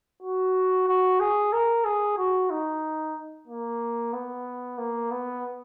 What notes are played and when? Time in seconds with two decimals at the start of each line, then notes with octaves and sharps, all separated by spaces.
0.22 F#4
0.88 F#4
1.20 G#4
1.53 A#4
1.85 G#4
2.18 F#4
2.50 D#4
3.48 A#3
4.13 B3
4.78 A#3
5.11 B3